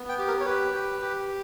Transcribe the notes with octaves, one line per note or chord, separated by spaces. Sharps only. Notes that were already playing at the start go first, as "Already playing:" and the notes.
Already playing: B3
G5
G4
A#4
C#5
G4 B4
G4
G4